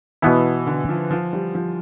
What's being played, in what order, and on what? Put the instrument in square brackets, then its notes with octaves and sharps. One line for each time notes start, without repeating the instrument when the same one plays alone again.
[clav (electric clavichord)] B2 B3 E4 [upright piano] E3
[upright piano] D3
F3
F3
G3
F3